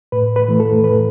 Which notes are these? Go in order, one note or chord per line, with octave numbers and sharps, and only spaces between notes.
A2 B4
B4
E3 A3
A4
A2 B4